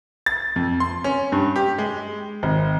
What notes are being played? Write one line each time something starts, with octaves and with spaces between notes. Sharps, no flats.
A6
F2
C6
C#4
G2
G4
G#3
G#1